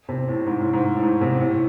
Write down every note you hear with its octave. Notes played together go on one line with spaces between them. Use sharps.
C3
A2
G#2
A2
G#2
A2
G#2
C3
A2
A2